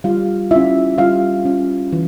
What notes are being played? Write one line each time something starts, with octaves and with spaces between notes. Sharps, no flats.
G3 F4 F5
C#4 E4 F4 E5
G3 F4 F5
C#4 F4
E3